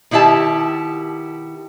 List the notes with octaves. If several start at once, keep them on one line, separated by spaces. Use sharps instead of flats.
B2 D#3 E4 G4 A5